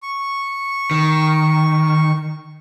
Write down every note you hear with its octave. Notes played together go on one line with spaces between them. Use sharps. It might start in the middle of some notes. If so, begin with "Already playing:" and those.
C#6
D#3